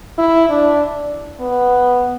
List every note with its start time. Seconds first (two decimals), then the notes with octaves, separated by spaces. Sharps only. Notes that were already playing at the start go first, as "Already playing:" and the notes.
0.18 E4
0.49 D4
1.40 B3